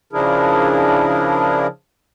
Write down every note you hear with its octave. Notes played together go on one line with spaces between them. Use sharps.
C#3 F3 D4 E4 G#4 A#4